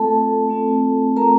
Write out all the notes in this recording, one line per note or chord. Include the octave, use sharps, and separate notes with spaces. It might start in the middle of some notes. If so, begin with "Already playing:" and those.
Already playing: A3 C4 F4 A4 A5
A3 C4 F4
A3 C4 F4 A#4 A#5